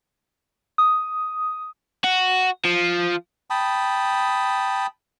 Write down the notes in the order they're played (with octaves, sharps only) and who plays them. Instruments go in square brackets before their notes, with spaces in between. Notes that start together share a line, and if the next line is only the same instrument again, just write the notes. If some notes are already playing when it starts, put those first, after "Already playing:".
[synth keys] D#6
[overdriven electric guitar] F#4
F3
[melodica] G5 A5 B5 D#6